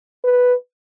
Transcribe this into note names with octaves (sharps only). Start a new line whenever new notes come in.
B4